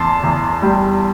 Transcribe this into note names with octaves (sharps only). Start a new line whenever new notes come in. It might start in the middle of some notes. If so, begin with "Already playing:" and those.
Already playing: E2 A5 C6
E2
G3